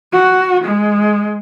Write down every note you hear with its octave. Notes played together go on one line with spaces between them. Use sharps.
F#4
G#3